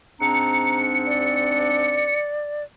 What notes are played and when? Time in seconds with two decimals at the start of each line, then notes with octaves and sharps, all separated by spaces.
0.20 G#2 C4 D4 A#5 C#7
1.06 D5